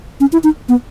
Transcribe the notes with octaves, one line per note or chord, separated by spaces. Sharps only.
C#4
E4
D#4
B3